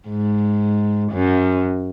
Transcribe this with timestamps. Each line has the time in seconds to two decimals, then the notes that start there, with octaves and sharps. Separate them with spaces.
0.08 G#2
1.12 F#2